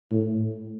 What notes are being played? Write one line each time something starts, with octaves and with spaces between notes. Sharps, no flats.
A2